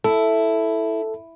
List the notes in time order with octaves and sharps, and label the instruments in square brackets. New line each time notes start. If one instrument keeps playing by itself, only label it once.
[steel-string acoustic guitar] E4 [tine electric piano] A4